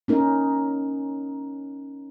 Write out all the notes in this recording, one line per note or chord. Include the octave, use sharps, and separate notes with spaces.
C#4 D#4 A#4